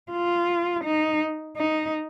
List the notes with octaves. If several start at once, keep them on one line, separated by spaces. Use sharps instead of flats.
F4
D#4
D#4